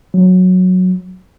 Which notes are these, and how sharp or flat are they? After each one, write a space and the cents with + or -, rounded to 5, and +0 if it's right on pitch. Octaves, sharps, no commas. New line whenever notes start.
F#3 -10